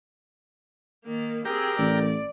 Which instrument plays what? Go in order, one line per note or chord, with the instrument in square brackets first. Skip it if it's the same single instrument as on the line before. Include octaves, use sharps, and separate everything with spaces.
[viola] D#3 A#3
[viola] C4 G#4 [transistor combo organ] G4 A#4
[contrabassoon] A1 [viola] D5